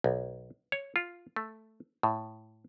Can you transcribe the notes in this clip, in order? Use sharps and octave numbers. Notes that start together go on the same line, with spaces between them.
B1
C#5
F4
A3
A2